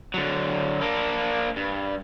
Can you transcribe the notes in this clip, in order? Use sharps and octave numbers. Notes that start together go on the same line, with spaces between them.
D3 F#3
A#3 D4
G2